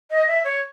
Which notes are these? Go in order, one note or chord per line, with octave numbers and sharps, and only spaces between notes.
D#5
E5
C#5